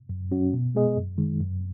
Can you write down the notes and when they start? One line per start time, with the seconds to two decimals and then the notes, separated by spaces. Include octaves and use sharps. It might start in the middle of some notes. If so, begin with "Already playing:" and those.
0.09 F#2
0.31 F#3 C#4 F#4
0.53 B2
0.75 G#3 B3 G#4 D#5
0.96 F#2
1.18 D#3 G#3
1.40 F#2